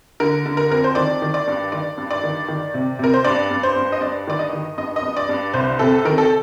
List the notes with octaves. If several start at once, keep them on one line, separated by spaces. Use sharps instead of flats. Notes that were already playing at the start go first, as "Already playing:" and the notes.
D3 A#4
D3
A#4
F2 A#4
C5
D#3 D5
D#3
D5
G2
D#3 D5
G2
D5
D#3
D#3
C3
C3 A#4
C5
G2 D5
G2
C5
G2
D#5
G2 D5
D#3 D5
D#5
D#3
G2 D#5
D#5
G2
D5
G2
C2 C5
C3 A4
D#3 A#4
A4